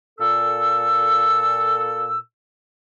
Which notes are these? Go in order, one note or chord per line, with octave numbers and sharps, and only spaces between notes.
A#2 A4 E6